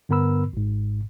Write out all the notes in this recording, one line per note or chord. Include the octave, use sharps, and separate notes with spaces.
G2 D3 B3 A#4 B5 E6
G#1 G#2